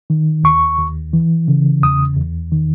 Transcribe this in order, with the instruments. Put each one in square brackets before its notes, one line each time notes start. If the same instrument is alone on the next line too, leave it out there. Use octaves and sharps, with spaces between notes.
[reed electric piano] D#3
D#2 C#6
D#2
E3
C#3
E2 D#6
E2
D#3